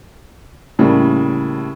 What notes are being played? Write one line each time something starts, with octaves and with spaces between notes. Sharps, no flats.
A2 C#3 G3 A#3